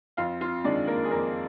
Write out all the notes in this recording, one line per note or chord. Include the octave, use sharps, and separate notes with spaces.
F2 F4 F5
F4 F5
D#3 G#3 D4 D5
A#3 A#4
G#4
F2 A#3 A#4